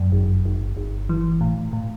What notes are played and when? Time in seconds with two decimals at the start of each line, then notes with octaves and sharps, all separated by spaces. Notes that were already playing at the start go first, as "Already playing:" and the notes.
Already playing: F#2
0.12 G1
0.45 G1
0.77 G1
1.09 E3
1.41 A2
1.73 A2